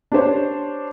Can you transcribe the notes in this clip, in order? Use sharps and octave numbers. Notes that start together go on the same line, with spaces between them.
D4 G4 C5 C#5